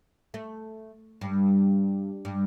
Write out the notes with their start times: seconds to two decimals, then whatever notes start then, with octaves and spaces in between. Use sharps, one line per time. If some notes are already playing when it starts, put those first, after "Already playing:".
0.34 A3
1.21 G2
2.25 G2